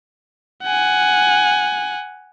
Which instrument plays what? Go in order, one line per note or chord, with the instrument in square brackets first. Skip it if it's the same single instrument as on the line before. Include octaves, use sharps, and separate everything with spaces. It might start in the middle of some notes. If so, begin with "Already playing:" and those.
[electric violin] F#5 G#5